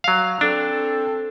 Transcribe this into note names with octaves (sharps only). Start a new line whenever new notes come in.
F#3 F5
C4 D4 A4